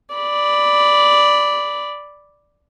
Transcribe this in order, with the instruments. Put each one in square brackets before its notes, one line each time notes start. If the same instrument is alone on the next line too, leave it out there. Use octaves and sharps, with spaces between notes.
[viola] D5 B5